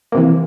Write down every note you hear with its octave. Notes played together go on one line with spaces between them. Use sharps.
C3 E3 A#3